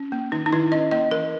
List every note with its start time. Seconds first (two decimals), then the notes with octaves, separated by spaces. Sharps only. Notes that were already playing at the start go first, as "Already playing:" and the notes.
Already playing: C#4
0.12 A#3
0.32 D#3 D#4
0.46 D#4
0.52 D#3 E4
0.72 C#4 D#5
0.91 A#3 D#5
1.11 E3 A#4